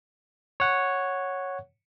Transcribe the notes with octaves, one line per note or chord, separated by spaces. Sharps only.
C#5 F#5